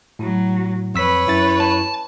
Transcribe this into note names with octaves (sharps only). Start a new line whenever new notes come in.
A2 F#3
F2 B4 C#5 E6 B6
F#2 E4 A6
A5